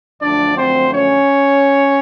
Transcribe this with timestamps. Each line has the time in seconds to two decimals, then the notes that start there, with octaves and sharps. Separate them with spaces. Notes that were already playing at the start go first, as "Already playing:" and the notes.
0.21 F#2 D3 F3 A3 D4 D5
0.56 C4 C5
0.93 C#4 C#5